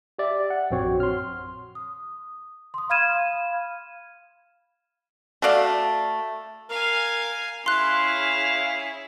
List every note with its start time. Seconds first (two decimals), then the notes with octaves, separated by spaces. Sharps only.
0.19 G4 D5 E5
0.50 F#5
0.71 A#1 F#2 C4 F#4 C#5
1.00 C6 F6
1.75 D#6
2.74 C6 D#6
2.90 F5 B5 F6 G#6 D#7 E7
5.42 A3 F#4 D5 F5
6.70 A#4 F5 G#5
7.66 C#4 E4 G#4 F5 C6 F#6